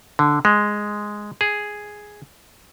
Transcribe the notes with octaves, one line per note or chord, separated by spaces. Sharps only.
D3
G#3
G#4